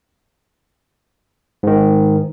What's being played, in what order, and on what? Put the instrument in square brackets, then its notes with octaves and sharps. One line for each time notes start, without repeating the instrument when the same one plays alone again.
[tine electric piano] G#2 D#3